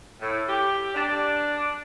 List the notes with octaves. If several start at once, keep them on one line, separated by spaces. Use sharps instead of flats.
A2
G4
D4